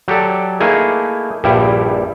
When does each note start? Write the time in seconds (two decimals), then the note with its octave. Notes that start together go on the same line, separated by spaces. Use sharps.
0.08 F#3 G4 A4 D5
0.60 A3 A#3 D#4 E4 G#4
1.44 A#1 G2 G3 E4 G5